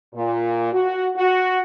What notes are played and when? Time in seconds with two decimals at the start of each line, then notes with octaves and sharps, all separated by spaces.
0.14 A#2
0.73 F#4
1.16 F#4